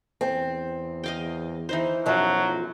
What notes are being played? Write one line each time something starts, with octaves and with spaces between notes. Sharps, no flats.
E2 C4
D#5 F5 G5
E3 D#4 C5
B1 F#2 F3 F#3